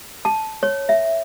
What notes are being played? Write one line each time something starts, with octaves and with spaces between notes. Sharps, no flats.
A5
C#5
E5